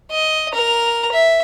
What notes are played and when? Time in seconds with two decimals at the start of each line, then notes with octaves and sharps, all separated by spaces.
0.11 D#5
0.54 A#4 A#5
1.12 E5